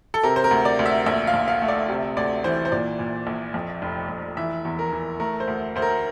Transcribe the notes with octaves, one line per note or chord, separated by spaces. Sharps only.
A4
C3 A#4
C5
A#4
D2
D5
D2
E5
A#1 E5
F5
A#1
F5
A3
D5
C3
D2 D5
E3 C5
C5
A#2 D5
A#2
A#1
F2
F1
F1
E3 E5
E2
A#4
E3
A3 A#4
C5
D2
D2 C5
A#4